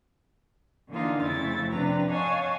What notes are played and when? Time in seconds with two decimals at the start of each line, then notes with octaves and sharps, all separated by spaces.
0.90 D3 E3 A#3 D4 D#4 F4
1.22 F2 C#3 F3 A3 E4 A6
1.72 C3 F3 D4 B4 A#5
2.11 C#5 D#5 F5 F#5 G#5 A5